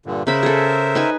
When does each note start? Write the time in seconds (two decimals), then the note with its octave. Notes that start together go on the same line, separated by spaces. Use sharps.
0.06 G2 A#2 D3
0.27 C#3 A#4 C5 E5 B5
0.43 G#4 A4
0.95 D#4 B4 G#5